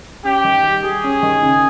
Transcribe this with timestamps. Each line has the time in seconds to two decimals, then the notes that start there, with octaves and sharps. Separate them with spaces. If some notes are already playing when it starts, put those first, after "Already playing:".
0.24 C#4 G4
0.44 D#3
0.64 G3
0.84 G3 G#4
1.04 C#4
1.23 D#3
1.43 C#3